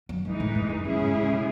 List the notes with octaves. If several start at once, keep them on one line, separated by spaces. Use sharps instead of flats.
F#2
G#2 E3 G#3 D#4
A2
G#2
F#2
F#2 C#3 G#3 C#4 E4 G#4
G#2
A2
B2